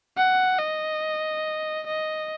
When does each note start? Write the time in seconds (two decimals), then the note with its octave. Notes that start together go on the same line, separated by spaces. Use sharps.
0.17 F#5
0.59 D#5
1.87 D#5